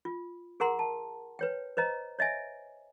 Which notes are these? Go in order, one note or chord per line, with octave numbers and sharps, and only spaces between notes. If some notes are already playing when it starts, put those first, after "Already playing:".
F4
G#4 A#4 F#5 A#5 C6
A5
B4 C#5 G5
B4 C5 D#5 A#5
C#5 D#5 E5 G#5